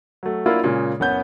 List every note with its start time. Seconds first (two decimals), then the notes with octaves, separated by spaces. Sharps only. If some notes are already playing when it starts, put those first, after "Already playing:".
0.23 F#3 A3
0.46 F#3 A#3 D4 E4 F4
0.64 A#2 C#3 G#3
1.00 F#1 B3 C#4 G6